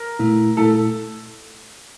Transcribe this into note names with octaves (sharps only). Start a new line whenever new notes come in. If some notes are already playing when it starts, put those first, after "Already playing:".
Already playing: A#4
A#2 A3 E4
A#2 A3 E4 A4